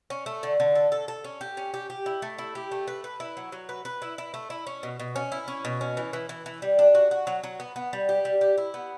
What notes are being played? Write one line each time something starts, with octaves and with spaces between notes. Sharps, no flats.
C#4
A3
D3
D3
A4
A4
A4
C#4
G4
C#4
G4
G4
E4
A3
E4
G4
A3
B4
B4
E4
F#3
F#3
B4
B4
E4
E4
A3
E4
C#4
B2
B2
C#4
E4
C#4
B2
C#4
E3
E3
E3
E3
G3
D4
F#4
F#4
F#3
F#3
B3
B3
G3
G4
G3
G4
E4
B3